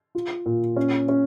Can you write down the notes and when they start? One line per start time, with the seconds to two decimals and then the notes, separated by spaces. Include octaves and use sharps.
0.15 F4
0.46 A#2
0.76 C#4
1.09 C#4